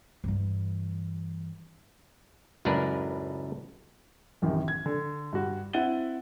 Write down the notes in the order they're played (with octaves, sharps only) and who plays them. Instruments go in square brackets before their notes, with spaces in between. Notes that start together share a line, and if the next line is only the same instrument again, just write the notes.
[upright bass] G2 E3
[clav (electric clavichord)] C#2 F#2 A2 D4 A#4 B4
[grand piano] A1 F#2 C3 D#3
G#6
D3
G2 F#4
C4 E4 F#5 A6 D#7 G7